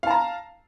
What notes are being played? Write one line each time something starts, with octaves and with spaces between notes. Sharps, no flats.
F5 A5 A#5